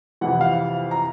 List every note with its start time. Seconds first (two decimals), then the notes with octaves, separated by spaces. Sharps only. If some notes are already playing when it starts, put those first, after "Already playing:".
0.21 F2 C3 E3 F#5
0.41 F5
0.91 A#5